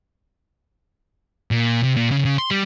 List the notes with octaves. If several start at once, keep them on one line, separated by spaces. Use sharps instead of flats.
A#2
C3
A#2
C#3
C#3
C6
G3